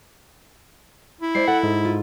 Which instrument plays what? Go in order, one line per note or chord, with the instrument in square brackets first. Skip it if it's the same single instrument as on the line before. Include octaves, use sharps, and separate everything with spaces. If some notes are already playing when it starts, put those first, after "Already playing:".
[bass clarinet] E4
[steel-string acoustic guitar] G#3 C5 D5 [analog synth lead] C7
[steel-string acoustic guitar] A4 [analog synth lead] F#5
[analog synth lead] G#2
[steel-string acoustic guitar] F4